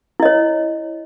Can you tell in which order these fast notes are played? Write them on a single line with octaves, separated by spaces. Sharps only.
E4 D#5 C#5